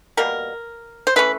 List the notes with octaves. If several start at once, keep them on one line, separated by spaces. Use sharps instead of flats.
B2 G3 A#3 A#4
C5
E3 A3 C#4 B4